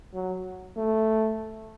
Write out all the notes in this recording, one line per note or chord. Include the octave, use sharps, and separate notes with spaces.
F#3
A3